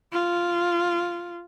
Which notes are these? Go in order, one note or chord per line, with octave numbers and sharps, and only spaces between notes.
F4